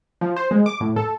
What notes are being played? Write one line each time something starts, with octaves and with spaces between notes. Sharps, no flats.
F3
C5
G#3
D6
A2
A4